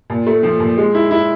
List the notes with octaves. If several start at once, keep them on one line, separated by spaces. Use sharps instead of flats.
A#2
A3
F3
A#2
G#3
E4
E4